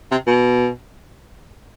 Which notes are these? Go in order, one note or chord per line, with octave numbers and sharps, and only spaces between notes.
C3
B2